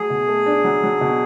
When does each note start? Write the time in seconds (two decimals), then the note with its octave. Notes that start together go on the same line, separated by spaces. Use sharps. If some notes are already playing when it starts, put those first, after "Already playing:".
Already playing: F#3 A3 G#4
0.10 B2
0.28 A3
0.46 D4
0.64 F#3
0.83 F#3
1.01 B2